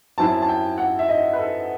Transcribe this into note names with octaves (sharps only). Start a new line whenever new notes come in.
F#2 F#3 C4 E4 A5
A5
G5
F#5
E5
D#5
B4
A4